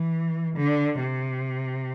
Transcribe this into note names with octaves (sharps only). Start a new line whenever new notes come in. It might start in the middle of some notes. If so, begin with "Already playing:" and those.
Already playing: E3
D3
C3